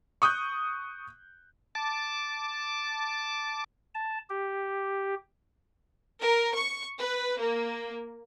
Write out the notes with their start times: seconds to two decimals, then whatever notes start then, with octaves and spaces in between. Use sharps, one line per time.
0.22 C#6 D#6 F#6 G6
1.75 A5 D6
3.94 A5
4.30 G4
6.21 A#4
6.54 C#6
6.99 B4
7.40 A#3